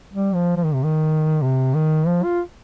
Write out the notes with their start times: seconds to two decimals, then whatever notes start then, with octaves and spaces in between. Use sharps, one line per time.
0.13 G3
0.35 F3
0.57 F3
0.65 D#3
0.74 C3
0.84 D#3
1.42 C3
1.74 D#3
2.07 F3
2.24 F4